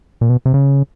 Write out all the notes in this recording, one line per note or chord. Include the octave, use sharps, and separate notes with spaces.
A#2
B2
C3
C#3